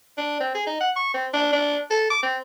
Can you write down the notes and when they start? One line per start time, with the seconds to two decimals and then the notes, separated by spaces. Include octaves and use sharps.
0.18 D4
0.40 C4
0.55 G#4
0.67 D#4
0.81 F#5
0.96 C#6
1.14 C4
1.34 D4
1.53 D4
1.90 A4
2.10 D6
2.23 C4